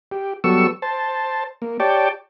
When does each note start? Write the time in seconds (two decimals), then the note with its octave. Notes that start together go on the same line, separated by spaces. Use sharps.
0.11 G4
0.44 F#3 G3 B3 A4 C#6 E6
0.82 C5 A5
1.62 A#3
1.80 G4 C#5 D5 G5 A5